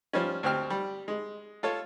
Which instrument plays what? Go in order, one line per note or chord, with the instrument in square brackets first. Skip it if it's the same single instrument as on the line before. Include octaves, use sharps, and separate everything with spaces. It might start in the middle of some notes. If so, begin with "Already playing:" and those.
[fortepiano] F3 G3 C#4
D2 C4 G4 F6
G3
G#3
F4 A4 C#5